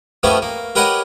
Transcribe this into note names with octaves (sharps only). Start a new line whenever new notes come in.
F3 A3 B3 C#4 G4 G#4
A#3
G4 A#4 B4 C#5 D#5 F#5